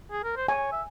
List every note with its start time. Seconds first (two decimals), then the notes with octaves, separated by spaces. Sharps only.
0.11 G#4
0.24 A#4
0.37 C5
0.48 C#5 G#5
0.72 E5